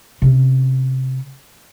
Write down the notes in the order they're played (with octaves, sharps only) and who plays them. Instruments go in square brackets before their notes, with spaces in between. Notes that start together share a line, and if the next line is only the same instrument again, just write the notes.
[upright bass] C3 C#4